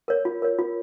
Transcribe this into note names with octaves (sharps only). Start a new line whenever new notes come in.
A#4 C#5
F4
A#4 C#5
F4